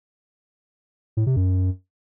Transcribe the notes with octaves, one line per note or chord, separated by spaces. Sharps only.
A2
C3
F#2